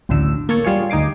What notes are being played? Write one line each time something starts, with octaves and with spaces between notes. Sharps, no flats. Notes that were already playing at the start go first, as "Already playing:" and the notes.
A1 D2 A2 D3 E6
A#3 A4 C#5
G3 F4 G#4 C#5
D2 D#4 G#5 D6 C7